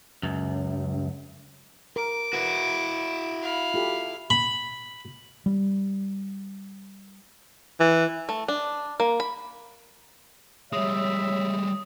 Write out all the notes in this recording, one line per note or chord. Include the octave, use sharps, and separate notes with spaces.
C#2 F#2
A#4 D6
E4 F#4 B4
F5 B5
F4 G4 A4
B5
G3
E3
A3
D4
A#3
B5
G3 G#3 C#5 E5 D#6